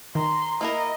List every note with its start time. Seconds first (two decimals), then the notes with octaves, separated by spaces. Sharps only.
0.15 D#3 A#5 C6
0.61 A#3 E4 A#4 D#5